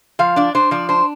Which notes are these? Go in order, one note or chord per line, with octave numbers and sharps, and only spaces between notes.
F3 F5
D4 D5
D4 C5
F3 D5
D4 C5